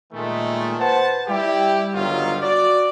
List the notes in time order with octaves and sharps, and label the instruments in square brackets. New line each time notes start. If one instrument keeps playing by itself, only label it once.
[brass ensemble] A#2 D#3 G#3 A3
B4 C5 F#5 A5
G3 E4 G4
G1 D#3 F#3 G3 F4
F#4 D5